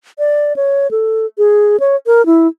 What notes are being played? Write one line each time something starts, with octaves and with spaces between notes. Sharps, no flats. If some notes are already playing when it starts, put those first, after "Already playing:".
D5
C#5
A4
G#4
C#5
A#4
E4